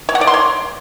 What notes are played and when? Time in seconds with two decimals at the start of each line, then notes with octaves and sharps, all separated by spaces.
0.09 C#5
0.15 F#5
0.21 D5
0.27 C6
0.34 C#5